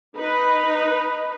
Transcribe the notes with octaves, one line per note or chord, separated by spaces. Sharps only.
D#4 B4